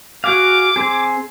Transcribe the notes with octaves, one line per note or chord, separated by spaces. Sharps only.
F#4 G#4 F5 D6
C4 G#4